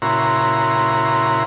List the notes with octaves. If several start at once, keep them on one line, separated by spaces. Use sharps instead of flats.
A#2 C#3 E4 F#4 A#5 C6